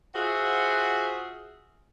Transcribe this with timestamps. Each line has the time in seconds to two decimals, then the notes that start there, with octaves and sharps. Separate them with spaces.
0.14 F4 F#4 G#4 C5 E5 F#5